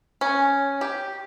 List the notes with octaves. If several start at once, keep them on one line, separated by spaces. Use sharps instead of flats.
C#4
G4